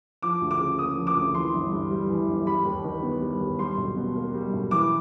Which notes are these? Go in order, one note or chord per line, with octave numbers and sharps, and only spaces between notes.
F3 D6
D2
D6
C#3
A#3 D#6
F3
D6
D2
E3 C6
G1
G2
G3
E3
G1
G3 B5
D#2
D#3
B3
G3
D#2
G3 C6
B1
B2
A#3
G3
B1
E3 D6